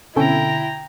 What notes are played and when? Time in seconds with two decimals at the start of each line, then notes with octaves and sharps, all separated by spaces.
0.16 B2 D3 C4 C#4 E4 A4 G5 A#5